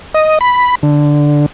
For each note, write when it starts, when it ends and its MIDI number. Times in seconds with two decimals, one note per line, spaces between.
0.14 0.39 75
0.41 0.75 83
0.83 1.46 50